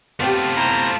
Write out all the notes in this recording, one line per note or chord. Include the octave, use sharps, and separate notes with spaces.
A3 B3 C4 F4 G4
E4 C5 A#5